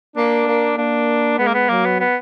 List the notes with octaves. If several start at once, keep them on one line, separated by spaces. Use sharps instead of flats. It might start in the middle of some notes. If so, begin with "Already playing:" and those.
A#3 D4
A#3
A#3 D4
G#3 B3
A#3
B3
F#3 A#3
B3
B3